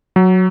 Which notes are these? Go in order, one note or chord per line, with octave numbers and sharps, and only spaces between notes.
F#3